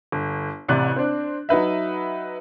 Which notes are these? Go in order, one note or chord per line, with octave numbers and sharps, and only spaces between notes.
G1
A1 C3 D5 F#6
C4 D4
F#3 D#4 B4 E5